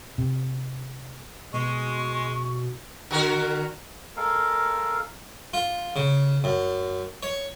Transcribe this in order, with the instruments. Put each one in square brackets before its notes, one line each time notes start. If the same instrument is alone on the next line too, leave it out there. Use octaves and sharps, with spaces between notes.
[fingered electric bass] C3
[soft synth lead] B2 [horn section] G#3 [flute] C#6
[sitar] D3 F#4 A#4
[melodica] G#3 A4 A#4 F5
[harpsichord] F4
C#3
F#2
C#5